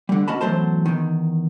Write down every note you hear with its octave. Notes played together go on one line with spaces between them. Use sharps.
D3 G3
C#4 F#4 D#5 A5 B5
E2 F#3 A3 C5 A5
E2 D#3